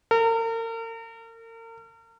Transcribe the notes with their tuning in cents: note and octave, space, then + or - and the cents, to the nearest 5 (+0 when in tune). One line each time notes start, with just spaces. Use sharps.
A#4 -40